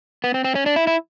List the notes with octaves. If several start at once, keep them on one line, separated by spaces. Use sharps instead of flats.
B3
C4
C4
C#4
D4
E4
E4